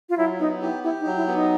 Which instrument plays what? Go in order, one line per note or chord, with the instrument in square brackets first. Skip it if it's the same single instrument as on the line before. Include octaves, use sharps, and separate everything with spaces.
[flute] F4
[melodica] F#3 [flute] E4
[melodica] B3 [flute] D#4
[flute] E4 [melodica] G4
[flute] E4 [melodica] G4
[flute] D#4
[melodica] F#3
[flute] E4
[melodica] B3
[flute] D#4